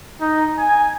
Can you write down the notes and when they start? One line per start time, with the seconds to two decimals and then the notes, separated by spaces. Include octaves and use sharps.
0.21 D#4
0.58 G#5